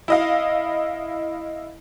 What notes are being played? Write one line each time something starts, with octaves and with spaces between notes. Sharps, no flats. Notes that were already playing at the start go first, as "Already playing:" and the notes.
E4 D#5 F5